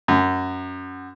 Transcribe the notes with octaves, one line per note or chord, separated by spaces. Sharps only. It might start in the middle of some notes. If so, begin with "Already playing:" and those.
F#2